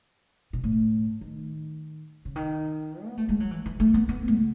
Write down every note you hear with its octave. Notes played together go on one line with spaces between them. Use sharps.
B2
A2
D#3
C#3
D#3
B3
A3
G#3
F#3
E3
E3
A3
B3
B3
A3
C#3